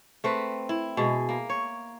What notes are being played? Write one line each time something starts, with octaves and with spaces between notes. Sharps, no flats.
A3 C4 B4
E4
B2 G#3
A#3
C#5